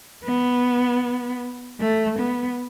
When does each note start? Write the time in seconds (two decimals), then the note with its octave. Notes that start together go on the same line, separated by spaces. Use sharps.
0.25 B3
1.80 A3
2.19 B3